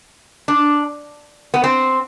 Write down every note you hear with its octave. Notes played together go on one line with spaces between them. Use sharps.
D4
B3
C4